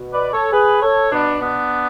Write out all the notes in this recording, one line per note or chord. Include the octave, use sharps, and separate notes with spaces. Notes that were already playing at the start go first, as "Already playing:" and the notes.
Already playing: B2
B4 D5
A4 C#5
G#4 B4
A4 C#5
B2 B3 D4
B3 D4